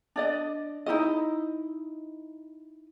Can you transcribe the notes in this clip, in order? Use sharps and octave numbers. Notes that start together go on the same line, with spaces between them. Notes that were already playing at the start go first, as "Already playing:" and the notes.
D4 D5 D#5
D#4 E4 F#4 D#5